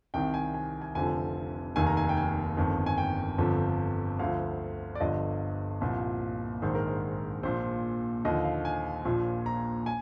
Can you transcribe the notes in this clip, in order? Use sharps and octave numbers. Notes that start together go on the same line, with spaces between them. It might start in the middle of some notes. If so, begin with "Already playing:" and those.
C2 C3 D#3 G5
G#5
G#5
G#5
F1 F2 D3 F3 G#5
F1 D#2 D#3 G#5
A#5
G#5
G5
G#5
G1 F2 D#3
G#5
G5
G1 F2 D3 F3
D2 D3 F3 F5
D5
G1 G2 D3 F3 D#5
C2 A#2 F3
A#1 G#2 D#3 C5
A#4
C5
A#1 A#2 F3 C5
D#2 D3 F3 D#5
F5
G#5
A#1 A#2 F3
A#5
G#5